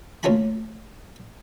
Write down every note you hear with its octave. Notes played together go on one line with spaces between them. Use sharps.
D2 A#3 C#4 F4 A5 B5